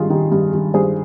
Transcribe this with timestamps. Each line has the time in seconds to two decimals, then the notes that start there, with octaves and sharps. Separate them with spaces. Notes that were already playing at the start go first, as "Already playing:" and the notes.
Already playing: G2 D#3 G3 F4 G#4
0.10 D#3 G3
0.32 G2
0.53 D#3 G3
0.74 G2 G#4 C5